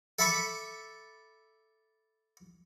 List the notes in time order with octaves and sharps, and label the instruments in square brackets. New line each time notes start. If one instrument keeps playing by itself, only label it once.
[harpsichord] A4 E5 A5 B5 C#6 D6